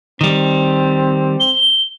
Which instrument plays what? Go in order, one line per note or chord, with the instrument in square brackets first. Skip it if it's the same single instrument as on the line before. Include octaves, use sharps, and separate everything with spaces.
[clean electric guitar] D#3 G3 [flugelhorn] C4
[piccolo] G7